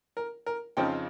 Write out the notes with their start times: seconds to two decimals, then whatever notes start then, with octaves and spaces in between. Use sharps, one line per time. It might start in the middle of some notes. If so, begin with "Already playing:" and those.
0.17 A#4
0.46 A#4
0.77 F2 C#3 F3 C4 D#4 G5